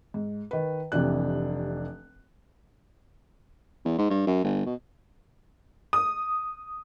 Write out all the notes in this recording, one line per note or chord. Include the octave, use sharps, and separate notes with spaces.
G#2
D#3 B4
F1 C3 E3 D4 F#6
E2
G#2
G2
F#2
G1
B2
D#6